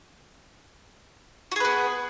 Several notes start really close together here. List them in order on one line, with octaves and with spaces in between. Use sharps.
F#4 G#4 B4 B3